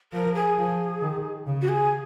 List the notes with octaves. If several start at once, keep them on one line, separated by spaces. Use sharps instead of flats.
F3 A#4
G#4
F3
D#3
C#3
F#4
G#4